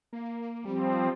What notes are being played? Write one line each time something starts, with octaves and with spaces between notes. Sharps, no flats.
A#3
F3 G3 C4